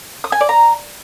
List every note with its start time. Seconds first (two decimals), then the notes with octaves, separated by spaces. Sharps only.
0.24 D#6
0.32 G#5
0.41 D5
0.49 A#5